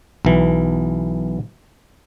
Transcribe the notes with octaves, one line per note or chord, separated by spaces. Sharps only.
B1 E3